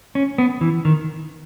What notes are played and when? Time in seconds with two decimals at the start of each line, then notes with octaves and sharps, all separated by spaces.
0.15 C#4
0.38 B3
0.61 E3
0.85 D#3